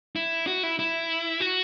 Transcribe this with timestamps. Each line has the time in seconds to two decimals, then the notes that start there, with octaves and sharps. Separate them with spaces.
0.16 E4
0.47 F#4
0.63 E4
0.79 E4
1.40 F#4